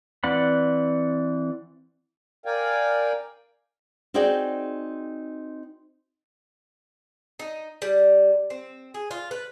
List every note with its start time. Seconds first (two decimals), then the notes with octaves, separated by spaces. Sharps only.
0.24 E3 C4 D5 F#5 B5
2.45 A#4 D5 F5 G5 G#5
4.14 C4 D#4 F#4 G#4 D5 G5
7.40 D#4
7.82 G3
8.50 C4
8.94 G#4
9.11 F4
9.31 B4